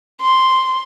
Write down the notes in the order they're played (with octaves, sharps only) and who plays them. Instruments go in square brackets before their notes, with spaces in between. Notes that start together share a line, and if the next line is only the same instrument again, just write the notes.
[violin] C6